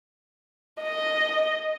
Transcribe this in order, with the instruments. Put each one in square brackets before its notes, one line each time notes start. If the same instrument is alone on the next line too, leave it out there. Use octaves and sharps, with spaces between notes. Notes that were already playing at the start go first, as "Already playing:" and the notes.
[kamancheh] D#5